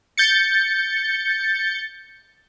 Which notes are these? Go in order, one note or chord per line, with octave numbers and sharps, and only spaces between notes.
G6 A6 C#7